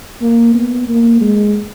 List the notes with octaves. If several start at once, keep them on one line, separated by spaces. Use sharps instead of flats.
A#3
B3
A#3
G#3